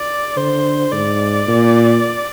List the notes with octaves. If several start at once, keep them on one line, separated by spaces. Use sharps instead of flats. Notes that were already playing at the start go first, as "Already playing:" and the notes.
Already playing: D5
D3 C5
G#2 D5
A#2